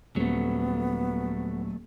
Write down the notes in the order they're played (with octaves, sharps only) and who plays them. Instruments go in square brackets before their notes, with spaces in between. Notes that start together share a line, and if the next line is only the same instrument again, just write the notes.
[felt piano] D#1 [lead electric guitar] F#3 A3 [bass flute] B3